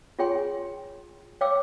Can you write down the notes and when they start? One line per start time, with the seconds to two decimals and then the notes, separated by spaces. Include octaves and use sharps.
0.19 F4 G#4 C#5 G5 G#5 C6
1.41 C#5 F5 G5 D6 E6